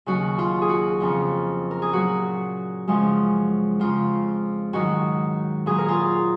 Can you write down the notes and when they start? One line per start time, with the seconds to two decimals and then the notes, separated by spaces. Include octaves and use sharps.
0.06 D#2 C#3 F#3 F#4
0.39 F4
0.62 G#4
0.69 F#4
1.00 F2 C#3 F3
1.71 A#4
1.82 G#4
1.93 A#2 F#3 F#4
2.88 F#2 C#3 F3 G#3
3.80 F2 C#3 F3 F4
4.73 G#2 D#3 F#3 F#4
5.66 A#2 F#3 G#4
5.78 A#4
5.88 F4 G#4